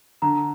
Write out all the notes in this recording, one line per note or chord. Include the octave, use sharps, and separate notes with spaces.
D3 A#5